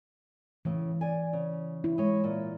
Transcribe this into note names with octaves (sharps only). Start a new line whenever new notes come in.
A2 C#3 E3
D5 G#5
C#3
E4
G#3 C#5
A#2